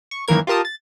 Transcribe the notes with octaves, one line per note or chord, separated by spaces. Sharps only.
C#6
F#2 D#3 E3 A#3 A#4 G#6
F4 G4 A#4 A5 D#6
A6